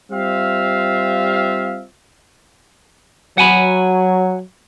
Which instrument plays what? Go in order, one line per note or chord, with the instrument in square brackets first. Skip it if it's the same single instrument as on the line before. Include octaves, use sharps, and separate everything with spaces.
[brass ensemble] G3 C4 F4 E5 F5
[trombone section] F#3 [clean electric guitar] F#5 G#5 B5